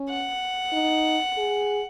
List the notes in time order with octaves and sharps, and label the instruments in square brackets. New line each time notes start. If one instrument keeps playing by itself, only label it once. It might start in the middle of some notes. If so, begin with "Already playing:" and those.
Already playing: [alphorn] C#4
[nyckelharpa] F#5
[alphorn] D#4
G#4